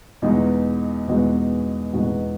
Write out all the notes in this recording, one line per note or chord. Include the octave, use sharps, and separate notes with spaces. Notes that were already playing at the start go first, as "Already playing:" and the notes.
E2 B2 G#3 D#4 F#4
E2 B2 G#3 D#4 F#4
E2 B2 G#3 D#4 F#4